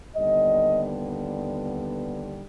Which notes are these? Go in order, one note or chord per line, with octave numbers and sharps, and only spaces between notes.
D#2 D3 G3 B3 D#5